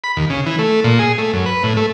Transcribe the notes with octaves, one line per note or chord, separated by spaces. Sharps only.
B5
D#2
C#3
E3
A3
A#2
G#4
A3
F#2
B4
A2
A3